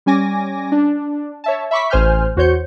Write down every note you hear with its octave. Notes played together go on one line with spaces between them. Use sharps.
G3 C#4 G#5 D6 A#6
D4
C#5 E5 A5
E5 B5 C#6 D6 B6
A1 C5 G#5 F6 G6
E2 F#4 C5 C#5 G6 C#7